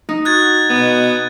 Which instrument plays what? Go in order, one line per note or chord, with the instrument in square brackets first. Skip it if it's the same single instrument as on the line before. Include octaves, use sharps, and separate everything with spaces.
[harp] D#4
[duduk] F#4 [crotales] F#6 G#6 A6
[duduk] B2 [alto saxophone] B3